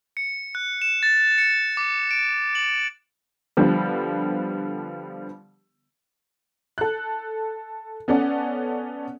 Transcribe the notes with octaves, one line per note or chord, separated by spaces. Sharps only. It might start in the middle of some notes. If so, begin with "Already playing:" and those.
C#7
F#6
E7
A6
C#7
D6
D7
F#7
D3 F3 G3 B3
A4 F#6
B3 C#4 A4 D5 F#5